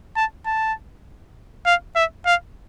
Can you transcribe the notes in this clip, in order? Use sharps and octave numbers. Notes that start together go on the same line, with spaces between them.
A5
A5
F5
E5
F5